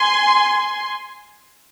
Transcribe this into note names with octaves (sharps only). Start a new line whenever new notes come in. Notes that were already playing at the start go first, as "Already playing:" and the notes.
Already playing: G#5 C6